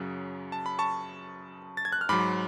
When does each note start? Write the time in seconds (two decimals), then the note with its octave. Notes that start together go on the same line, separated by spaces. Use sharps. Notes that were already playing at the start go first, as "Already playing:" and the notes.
Already playing: F#2 C#3 F#3
0.52 A5
0.66 B5
0.79 A5 C#6
1.77 A6
1.85 G#6
1.92 F#6
2.01 F6
2.09 G#2 F#3 B5 D6